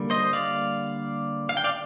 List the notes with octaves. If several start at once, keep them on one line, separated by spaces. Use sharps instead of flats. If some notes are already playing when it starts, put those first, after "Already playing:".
Already playing: D3 G3 A#3
C5 D#5
D5 F5
F5
G5
D5 F5